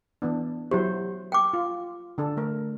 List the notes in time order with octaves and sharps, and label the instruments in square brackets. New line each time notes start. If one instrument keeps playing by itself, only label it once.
[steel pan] E3 B3 D4
[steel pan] F#3 E4 C5 [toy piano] G4
[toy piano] G5 D6
[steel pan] F4
D3 D4 A4
A3 A#4